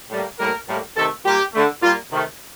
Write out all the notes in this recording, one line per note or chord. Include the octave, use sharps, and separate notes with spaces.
A2 G3 A#3
A2 G3 A#3 A#4
A2 G3 A#3
C3 D#3 A3 A4
A#2 G3 A#3 G4
D3 A3
A#2 G3 A#3 F4
C3 D#3 A3